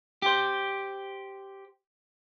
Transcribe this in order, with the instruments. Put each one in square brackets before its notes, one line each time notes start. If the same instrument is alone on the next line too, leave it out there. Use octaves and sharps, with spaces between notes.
[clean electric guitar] G4 C5